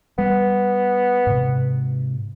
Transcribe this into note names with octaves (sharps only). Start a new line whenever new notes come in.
G3 B3
G#2 C3